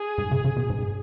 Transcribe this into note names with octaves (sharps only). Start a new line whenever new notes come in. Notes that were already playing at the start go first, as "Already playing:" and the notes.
Already playing: G#4
G#2
C#3
C#3
B2
G#2